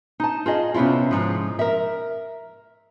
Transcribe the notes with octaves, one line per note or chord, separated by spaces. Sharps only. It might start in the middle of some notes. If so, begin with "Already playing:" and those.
D#4 A5
F4 G#4 D#5
C3 B3 C#4 E4 F4
G#2 F3
A#4 E5